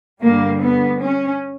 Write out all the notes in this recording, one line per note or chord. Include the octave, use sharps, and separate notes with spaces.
G2 D3 G3 A#3
B3
C#4